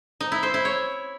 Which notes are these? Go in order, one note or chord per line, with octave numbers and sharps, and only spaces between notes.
D#4
E4
C5
E4
C#5